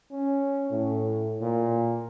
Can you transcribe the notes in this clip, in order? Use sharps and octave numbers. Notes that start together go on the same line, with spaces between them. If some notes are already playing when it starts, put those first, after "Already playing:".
C#4
A2
A#2